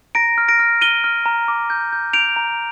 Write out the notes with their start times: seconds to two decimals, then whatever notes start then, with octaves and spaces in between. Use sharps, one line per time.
0.15 A#5 A#6 D7
0.38 F6
0.48 A#6 D7
0.59 F6
0.81 F6 D#7 G7
1.04 F6
1.26 A#5
1.48 D6
1.70 G6
1.92 G6
2.13 G6 D7 F7
2.36 A#5